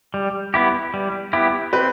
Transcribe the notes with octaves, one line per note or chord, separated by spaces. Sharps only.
G3
B3 E4 G4
G3
B3 E4 G4
C4 B4